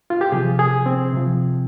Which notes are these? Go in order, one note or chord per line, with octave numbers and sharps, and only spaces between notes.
F4
G4
C3 F3 G#4
G#4
C4
C3 F3